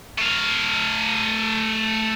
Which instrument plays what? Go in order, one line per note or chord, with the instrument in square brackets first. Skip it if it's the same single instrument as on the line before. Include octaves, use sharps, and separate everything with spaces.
[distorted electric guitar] A3 F5